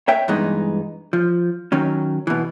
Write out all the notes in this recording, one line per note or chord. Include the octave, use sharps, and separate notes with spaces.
C#5 E5 G5
G2 E3 G#3 B3 D#4
F3
D#3 F#3 C#4
B2 E3